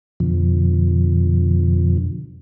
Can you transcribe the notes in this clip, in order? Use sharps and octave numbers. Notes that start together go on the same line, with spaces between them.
F2 B2 D3 F3